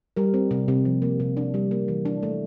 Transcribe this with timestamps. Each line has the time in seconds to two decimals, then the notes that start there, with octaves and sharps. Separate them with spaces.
0.16 G3 A#4
0.34 C4
0.51 C3
0.68 C3
0.85 F3
1.02 A#3
1.20 C3
1.37 D4
1.54 G3
1.71 A#3
1.88 E3
2.05 D4
2.23 A3